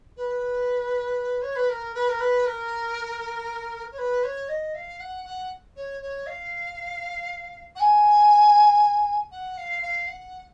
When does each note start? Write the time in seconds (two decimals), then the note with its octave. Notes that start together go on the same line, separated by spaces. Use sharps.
0.16 B4
1.41 C#5
1.55 B4
1.69 A#4
1.94 B4
2.08 A#4
2.19 B4
2.45 A#4
3.91 C#5
3.97 B4
4.23 C#5
4.48 D#5
4.74 F5
4.99 F#5
5.24 F#5
5.76 C#5
6.01 C#5
6.26 F5
7.75 F#5
7.79 G#5
9.31 F#5
9.57 F5
9.82 F5
10.07 F#5